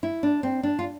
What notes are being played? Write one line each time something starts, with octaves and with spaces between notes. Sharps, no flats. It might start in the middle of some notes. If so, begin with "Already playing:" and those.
E4
D4
C4
D4
F4